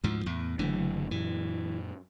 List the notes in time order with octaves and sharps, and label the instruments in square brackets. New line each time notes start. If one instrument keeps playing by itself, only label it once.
[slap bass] D2 G#2 F3
E2 A2
[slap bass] F#1 D3 E3 [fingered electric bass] F#3 A3 D4
[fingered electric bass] F#2 A#2 [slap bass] E3